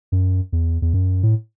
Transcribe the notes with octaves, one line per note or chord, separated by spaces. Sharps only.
F#2
E2
E2
F#2
A2